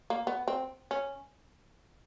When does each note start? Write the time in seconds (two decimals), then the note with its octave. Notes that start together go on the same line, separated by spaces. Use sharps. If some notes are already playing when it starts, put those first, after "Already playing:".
0.10 A#3
0.27 B3
0.48 C4
0.91 C#4